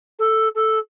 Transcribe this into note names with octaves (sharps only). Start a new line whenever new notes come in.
A4
A4